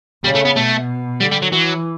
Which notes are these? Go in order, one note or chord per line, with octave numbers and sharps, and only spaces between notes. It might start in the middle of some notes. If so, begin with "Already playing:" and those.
C#3 G3
A3
B3
B2 A3
D3 G3
G3
F#3
E3 F#3